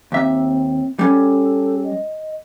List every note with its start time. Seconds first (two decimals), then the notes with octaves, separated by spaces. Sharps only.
0.12 D#2 C4 E5
0.99 G3 C#4 A4
1.85 D#5